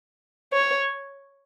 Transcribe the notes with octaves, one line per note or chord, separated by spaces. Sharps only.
C#5